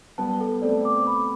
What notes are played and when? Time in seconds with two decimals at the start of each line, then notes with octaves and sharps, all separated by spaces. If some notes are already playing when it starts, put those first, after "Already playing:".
0.18 G3 B3 A5
0.40 A4
0.62 A3 C4 D5
0.85 D6
1.07 B5